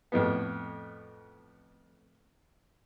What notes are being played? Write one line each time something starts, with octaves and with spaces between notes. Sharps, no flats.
F2 A2 B3